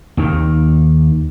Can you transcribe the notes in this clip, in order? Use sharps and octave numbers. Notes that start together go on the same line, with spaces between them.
D#2 D#3